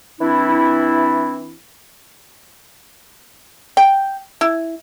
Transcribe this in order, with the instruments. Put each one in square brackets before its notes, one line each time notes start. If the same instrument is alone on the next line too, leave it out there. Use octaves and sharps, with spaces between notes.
[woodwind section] E3 C4 D4 E4
[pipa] G5
E4